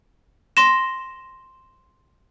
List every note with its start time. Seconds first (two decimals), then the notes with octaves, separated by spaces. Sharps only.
0.57 C6 A#6 E7